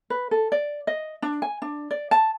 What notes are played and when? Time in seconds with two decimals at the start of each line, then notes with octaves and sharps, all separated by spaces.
0.10 B4
0.31 A4
0.52 D5
0.87 D#5
1.22 D4
1.42 G#5
1.62 D4
1.91 D5
2.11 A5